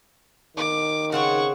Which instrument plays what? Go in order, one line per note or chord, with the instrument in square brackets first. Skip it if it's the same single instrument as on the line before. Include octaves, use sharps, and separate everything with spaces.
[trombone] D#3 [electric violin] D6
[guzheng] C#3 C4 C#5 [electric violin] F#5 C#6